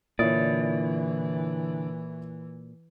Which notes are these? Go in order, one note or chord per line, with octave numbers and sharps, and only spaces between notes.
A#2 D3 E3 E4 C#5 D5 D#6